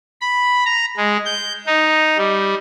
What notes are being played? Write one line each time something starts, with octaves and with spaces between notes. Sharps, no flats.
B5
A#5
G#3
G6
D#4
G3